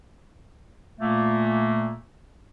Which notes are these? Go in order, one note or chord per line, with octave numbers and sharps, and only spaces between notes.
A#2 A3 A#3